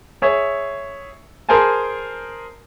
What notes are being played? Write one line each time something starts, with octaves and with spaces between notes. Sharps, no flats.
G#4 C#5 E5
G#4 A#4 C5 G#5 A5